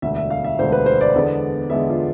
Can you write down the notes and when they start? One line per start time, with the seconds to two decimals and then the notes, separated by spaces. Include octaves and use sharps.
0.02 E1 D2 D3 E5
0.16 E5
0.30 F5
0.44 E5
0.58 E1 D2 D3 C5
0.72 B4
0.86 C5
1.01 D5
1.14 E2 D3 G#3 B3
1.70 E2 D3 G#3 B3 E5
1.89 F4